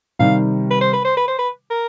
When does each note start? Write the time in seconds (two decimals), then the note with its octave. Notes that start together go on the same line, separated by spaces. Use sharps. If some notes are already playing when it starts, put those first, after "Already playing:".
0.19 C3 D#3 G3 F5
0.70 B4
0.81 C5
0.93 B4
1.04 C5
1.16 B4
1.27 C5
1.39 B4
1.70 A#4